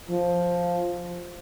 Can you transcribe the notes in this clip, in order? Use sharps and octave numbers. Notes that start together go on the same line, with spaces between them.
F3